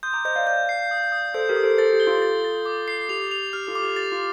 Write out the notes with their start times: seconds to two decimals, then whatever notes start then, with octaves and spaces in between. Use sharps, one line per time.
0.03 C6 D#6 G6
0.14 A#5 D6
0.25 C5 D#5 G6
0.36 D5 F5
0.47 D5 F5 G6
0.69 C7
0.91 D#6
1.12 D#6
1.34 A4 C5 G6
1.49 G4 A#4
1.56 D#6
1.64 A4 C5
1.78 A4 C5 A6
1.93 G4
2.00 G7
2.07 F4 A4
2.22 A6
2.44 A6
2.65 D6
2.88 C7
3.09 G4 F7
3.31 F7
3.53 G4 F6
3.67 F4 A4
3.75 D6
3.83 G4
3.96 G4 A6
4.12 F4